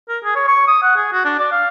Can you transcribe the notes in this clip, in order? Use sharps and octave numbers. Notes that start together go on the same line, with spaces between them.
A#4
G#4
C#5
C#6
D#6
F#5
G#4
F#4
D4
D5
F5